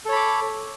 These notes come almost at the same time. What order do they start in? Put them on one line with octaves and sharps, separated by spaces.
A4 C#5 B5 D6